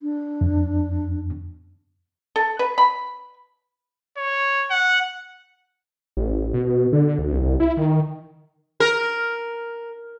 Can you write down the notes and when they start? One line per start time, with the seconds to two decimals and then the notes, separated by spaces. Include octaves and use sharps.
0.02 D4
0.41 F2
2.36 A4
2.59 B4
2.78 B5
4.17 C#5
4.70 F#5
6.17 A1
6.54 B2
6.93 D3
7.19 D2
7.32 C2
7.60 E4
7.77 D#3
8.80 A#4